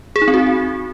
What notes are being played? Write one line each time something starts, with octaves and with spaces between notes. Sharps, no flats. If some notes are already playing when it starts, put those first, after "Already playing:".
G#4
D#4
C4
F#4